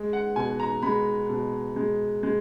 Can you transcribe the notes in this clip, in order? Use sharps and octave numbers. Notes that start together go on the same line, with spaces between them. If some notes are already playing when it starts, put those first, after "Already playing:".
Already playing: G#3
F#5
B2 G#5
A#5
G#3 B5
B2
G#3
G#3